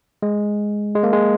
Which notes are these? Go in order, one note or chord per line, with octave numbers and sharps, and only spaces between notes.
G#3
G#3
A#3
G#3